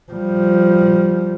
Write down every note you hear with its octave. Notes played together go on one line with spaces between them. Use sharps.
F3 G3